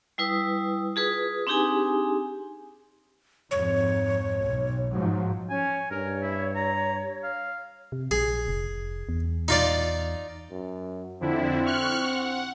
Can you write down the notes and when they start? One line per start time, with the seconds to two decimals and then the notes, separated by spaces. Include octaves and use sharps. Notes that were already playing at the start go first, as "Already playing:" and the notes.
0.18 G3 E4 B4 D#6
0.96 F4 G#4 B4 D#6
1.47 C4 D4 D#4 G4 G#4 G#5
3.51 F2 G#2 C#5
4.40 B1
4.93 G#2 F3 F#3
5.50 C#4 G#5
5.91 G2 A#4 C#5
6.22 E4
6.56 A#5
7.23 F5
7.92 C3
8.11 A#1 G#4
8.48 F1
9.09 E2
9.48 D#4 F4 D5
10.51 F#2
11.20 F2 D3 C4 E4
11.65 C#6 F6 F#6
12.04 F#5